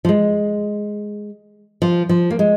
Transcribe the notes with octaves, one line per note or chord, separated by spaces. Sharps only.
F3
G#3
F3
F3
A#3
G#3